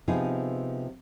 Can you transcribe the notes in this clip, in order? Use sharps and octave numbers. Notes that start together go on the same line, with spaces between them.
C3 F3 B3 D#4 G#4